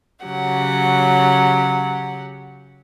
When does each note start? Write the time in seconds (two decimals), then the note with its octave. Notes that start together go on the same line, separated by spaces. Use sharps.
0.24 C#3 F#3 G4 F#5